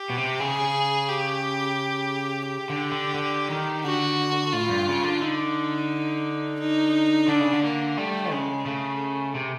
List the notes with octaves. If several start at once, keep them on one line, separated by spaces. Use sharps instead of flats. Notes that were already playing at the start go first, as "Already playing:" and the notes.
Already playing: G4
B2
C3
C#3 G#4
G4
G4
D3
D3
D3
D#3
D3 F#4
A2 F4
G2
C#3
D3
D3 D#4
D#4
D3 D4
C#3
D3
A#3
G3 A3
C#3 G#3
C#3 A3
C3